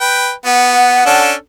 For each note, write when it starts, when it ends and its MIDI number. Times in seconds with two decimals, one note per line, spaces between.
0.01 0.31 71
0.01 0.31 79
0.45 1.06 59
0.45 1.25 78
1.06 1.33 61
1.06 1.33 62
1.06 1.33 69